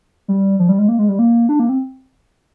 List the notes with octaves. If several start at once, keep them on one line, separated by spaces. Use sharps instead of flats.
G3
F3
G3
G#3
A#3
G#3
G3
A#3
D4
A#3
C4